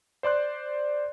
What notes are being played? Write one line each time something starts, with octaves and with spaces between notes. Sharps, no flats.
C5 D5 C6 F#6